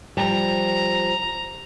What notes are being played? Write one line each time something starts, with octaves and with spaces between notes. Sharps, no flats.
F3 G3 A#5